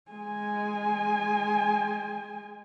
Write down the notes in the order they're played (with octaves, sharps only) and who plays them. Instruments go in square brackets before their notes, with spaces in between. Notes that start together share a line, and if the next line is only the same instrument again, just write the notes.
[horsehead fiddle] G#3 G#5